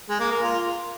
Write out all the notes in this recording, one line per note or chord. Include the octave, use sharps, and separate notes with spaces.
G#3
A#3
A#4
F4